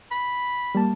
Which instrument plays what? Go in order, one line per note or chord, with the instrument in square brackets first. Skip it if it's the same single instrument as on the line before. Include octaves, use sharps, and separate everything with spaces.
[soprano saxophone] B5
[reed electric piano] G3 A#3 A5